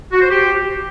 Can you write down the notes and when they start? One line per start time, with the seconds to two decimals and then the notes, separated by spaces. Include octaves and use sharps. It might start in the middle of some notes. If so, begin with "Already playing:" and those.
0.12 F#4
0.21 C5
0.30 G4